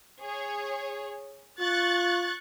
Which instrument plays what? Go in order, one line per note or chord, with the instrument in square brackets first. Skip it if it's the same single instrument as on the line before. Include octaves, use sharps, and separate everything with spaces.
[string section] G#4 C#5
[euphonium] F4 [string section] C#6 F#6 A6